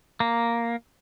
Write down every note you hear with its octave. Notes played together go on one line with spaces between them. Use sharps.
A#3